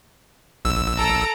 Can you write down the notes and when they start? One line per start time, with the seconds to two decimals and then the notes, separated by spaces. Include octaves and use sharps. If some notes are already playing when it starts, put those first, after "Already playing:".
0.65 A#1 E6
0.97 A4 A#5 D7